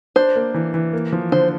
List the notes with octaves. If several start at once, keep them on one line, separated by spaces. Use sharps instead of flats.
D4 C5
A#3
E3
E3
A#3
F3
D3 C5